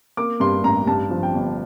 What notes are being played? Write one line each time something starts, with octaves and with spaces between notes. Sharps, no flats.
A#3 D6
G2 C6
A1 A#5
G2 A5
F3
G5
G1